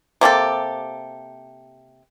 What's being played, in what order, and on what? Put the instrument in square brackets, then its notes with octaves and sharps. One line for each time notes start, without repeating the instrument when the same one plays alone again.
[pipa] C3 A#3 G4 A4